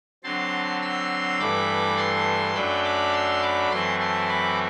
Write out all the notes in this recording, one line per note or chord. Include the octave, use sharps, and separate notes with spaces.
D3 F#3 C4 A5 C6
C6 E6
G2 E3 A3 B5 D6
A5 C6
F#2 F#3 A3 D4 G5 B5
B5 D6
C6 E6
B5 D6
F#2 E3 A3 C4 E4 A5 C6
A5 C6
B5 D6